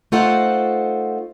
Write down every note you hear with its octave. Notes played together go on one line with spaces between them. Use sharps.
A3 D#4 F4 A4 C5 F#5